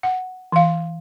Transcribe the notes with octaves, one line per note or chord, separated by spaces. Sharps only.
F#5
E3 F5